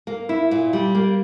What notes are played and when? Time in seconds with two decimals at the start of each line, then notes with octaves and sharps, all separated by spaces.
0.07 A#3
0.29 E4
0.51 A#2
0.73 G3
0.95 A#3